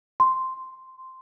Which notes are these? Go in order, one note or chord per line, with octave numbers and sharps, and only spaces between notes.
C6